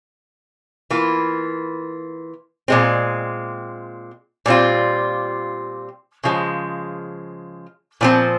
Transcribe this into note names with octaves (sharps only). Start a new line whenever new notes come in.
E3 A#3 F4
A#2 G#3 C4
A#2 G3 C4 F4
C#3 F3 G#3
A#2 F3 C4